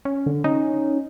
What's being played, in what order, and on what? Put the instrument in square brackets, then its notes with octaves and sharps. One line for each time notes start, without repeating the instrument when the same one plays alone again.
[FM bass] C#4
[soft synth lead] D3
[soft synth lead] C#4 [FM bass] D#4